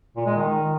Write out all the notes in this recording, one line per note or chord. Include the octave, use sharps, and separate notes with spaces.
A#2
G#3
D#3